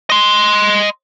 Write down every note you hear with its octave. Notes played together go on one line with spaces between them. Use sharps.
D#5 C6